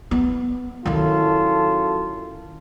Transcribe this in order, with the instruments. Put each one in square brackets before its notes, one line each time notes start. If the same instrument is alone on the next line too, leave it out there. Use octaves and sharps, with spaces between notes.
[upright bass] B3
[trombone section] F#2 F4 A4 [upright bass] D#3 E4